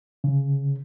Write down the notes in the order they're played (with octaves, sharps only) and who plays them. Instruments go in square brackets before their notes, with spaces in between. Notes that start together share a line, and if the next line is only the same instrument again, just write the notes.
[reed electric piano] C#3